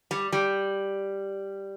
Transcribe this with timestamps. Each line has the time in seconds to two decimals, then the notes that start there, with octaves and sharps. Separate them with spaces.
0.11 G3
0.32 G3